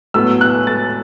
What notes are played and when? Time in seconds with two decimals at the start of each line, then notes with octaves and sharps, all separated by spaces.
0.14 A2 F#3 B3 E6
0.41 F#6
0.67 A6